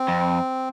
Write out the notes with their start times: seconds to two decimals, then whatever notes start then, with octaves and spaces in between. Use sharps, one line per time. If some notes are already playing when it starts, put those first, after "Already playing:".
Already playing: C4
0.08 F2